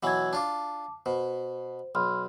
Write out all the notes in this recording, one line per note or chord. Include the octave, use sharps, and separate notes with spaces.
B2 E3 F#3 F#5 E6 G#6
D4 F4 A5 D6
B2 C5
B1 B5 C6 F6